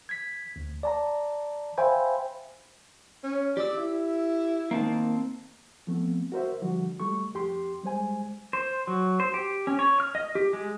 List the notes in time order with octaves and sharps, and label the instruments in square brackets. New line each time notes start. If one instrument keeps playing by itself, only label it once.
[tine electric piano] G#6 B6
D2
D5 A5 A#5
C5 E5 F5 G5 G#5 B5
[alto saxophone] C#4
[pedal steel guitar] G4 E6 [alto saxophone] D5
[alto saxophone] E4
[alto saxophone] D#3 [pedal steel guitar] A#3 C4 A5
[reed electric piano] F3 A3 B3 C4
F#4 A#4 C5 E5
D3 F3 G3 F#4
G3 A3 C#6
F2 G4 C6
G3 G#3 C5 G#5
[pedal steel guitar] C5
F#3
C5
G4
C#4
C#5
F6
D#5
G4
G#3